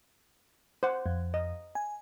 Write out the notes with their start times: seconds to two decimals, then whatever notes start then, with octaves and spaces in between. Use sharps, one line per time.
0.83 C5 F#5
1.06 F2
1.34 D#5
1.75 G#5